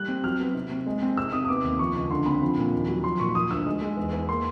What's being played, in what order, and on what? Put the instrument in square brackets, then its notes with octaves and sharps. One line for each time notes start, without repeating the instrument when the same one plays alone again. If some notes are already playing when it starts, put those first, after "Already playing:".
Already playing: [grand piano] G3 F#6
C4
F#3 F6
B3
C3
C4
G#3
C4
C3 E6
C3 D#6
D#6
B3 D6
D#2
F3 C#6
C#2
D3 C6
C4 B5
F3
A#2
D#2
F#3
F3 C6
A#2 C#6
F3 D#6
D2 E6
G#3
G#3
E2
E2
A#3 C6